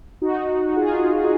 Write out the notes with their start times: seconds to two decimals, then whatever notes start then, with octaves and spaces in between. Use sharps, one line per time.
0.22 D#4 F#4
0.76 F4 G#4